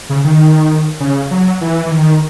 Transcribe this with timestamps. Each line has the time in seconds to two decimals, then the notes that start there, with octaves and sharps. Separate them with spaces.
0.10 C#3
0.24 D#3
1.00 C#3
1.31 F#3
1.61 E3
1.86 E3
1.91 D#3